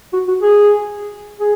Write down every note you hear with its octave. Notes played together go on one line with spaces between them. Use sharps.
F#4
F#4
G#4
G#4